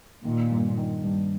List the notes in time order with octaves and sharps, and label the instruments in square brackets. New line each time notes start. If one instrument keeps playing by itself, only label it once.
[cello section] A#2 [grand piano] D#3
[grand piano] G2
D#3
G2